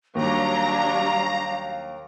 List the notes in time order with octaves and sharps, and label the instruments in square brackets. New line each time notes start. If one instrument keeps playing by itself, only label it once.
[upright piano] D#2 [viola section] F#3 G3 D4 [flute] F5 [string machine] A#5